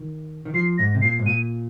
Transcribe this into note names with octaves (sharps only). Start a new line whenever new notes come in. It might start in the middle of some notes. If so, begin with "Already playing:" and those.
Already playing: D#3
D#3
F3 C7
G#2 A#6
C3
A#2 C7
G#2
A#2 D#7